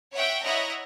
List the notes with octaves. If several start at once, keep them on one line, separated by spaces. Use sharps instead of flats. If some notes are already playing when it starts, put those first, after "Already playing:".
C#5 E5 F#5 G5
E4 C#5 D#5 E5 F#5 A#5